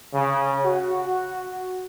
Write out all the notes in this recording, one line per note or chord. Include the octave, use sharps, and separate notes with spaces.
C#3
F#4